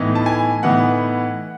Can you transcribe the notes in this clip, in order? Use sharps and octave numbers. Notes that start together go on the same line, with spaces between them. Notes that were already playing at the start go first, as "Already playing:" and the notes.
Already playing: A2 E3 B3 D#4
A5
G#5
A2 E3 B3 D#4 F#5